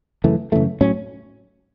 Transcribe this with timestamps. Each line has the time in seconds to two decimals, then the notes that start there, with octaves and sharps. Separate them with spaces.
0.24 F#2 C#3 E3 A3
0.52 F#2 C#3 E3 A3
0.81 A2 F#3 C#4